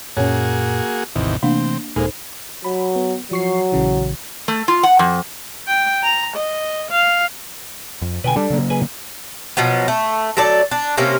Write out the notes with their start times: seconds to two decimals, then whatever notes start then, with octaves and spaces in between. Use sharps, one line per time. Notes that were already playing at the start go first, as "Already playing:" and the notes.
0.17 F#2 A#2 A#3 C#4 F#4 G#4 C#5
1.15 A1 E2 C3 D#3
1.43 C3 E3 A3 A#3 C4 D4 F5
1.96 D#1 A#2 G#3 D#4 A4 C5
2.64 F#3 B5
2.96 B3
3.31 F3 F#3 C#6 C7
3.72 A#1 C#3 E3
4.48 A3
4.68 F4
4.83 F#5
4.99 F2
5.67 G5
6.03 A#5
6.36 D#5
6.91 F5
8.02 F2
8.24 B2 D3 B4 G5 G#5
8.36 G3 D4 A4
8.50 C#3 F#3 A#3
8.70 G#4 B4 G#5
9.57 B2 F3 F#3 B3
9.88 A3
10.37 F#3 A3 A4 D5
10.71 D4
10.97 C3 A#3 C#4